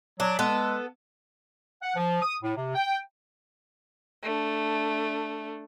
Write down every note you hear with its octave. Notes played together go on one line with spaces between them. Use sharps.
F#3 D4
G#3 B3 A4
F#5
F3
D#6
A2
C3
G5
A3 D4